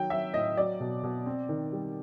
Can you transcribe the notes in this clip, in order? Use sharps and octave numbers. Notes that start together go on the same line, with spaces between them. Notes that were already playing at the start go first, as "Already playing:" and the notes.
Already playing: D#3 F#3 G5
F#3 E5
A2 D#5
F#3 D5
B2
B2
C4
D#3
G3